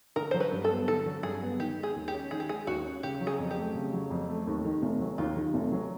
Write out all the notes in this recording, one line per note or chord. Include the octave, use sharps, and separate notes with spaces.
D3 A#4
F#3 C5
B4
G2
A4
B3
D3 A4
F#3
G2 G#4
B3
D#3 G4
G#3
G#4
D#2
G4
C#4
D#3 G#4
G4
G#3 G#4
D#2 F#4
C#4
C#3 G4
F#3
G#4
F2
G4
A3
C#3
F#3
F2
A3
D#2
D#3
F1
F#3
D#2 F4
D#3
F1
F#3